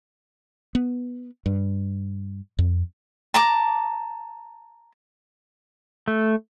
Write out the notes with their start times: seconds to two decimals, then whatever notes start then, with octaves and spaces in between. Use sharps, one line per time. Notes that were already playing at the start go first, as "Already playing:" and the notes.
0.75 B3
1.46 G2
2.59 F2
3.34 A5 A#5 D6
6.08 A3